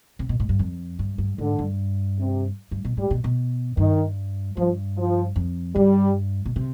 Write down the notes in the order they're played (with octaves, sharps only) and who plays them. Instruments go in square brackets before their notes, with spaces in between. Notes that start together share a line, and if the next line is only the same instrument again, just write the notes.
[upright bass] C3
B2
G#2
G2
F2
G2
G2
[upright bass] G#2 [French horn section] D3
[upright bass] G2
[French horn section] C3
[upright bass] G2
B2
[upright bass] G#2 [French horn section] G3
[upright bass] B2
B2
[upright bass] G2 [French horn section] D#3
[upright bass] G2 [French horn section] F3
[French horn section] F3
[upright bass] F2
[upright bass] G2 [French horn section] G3
[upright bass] B2
C3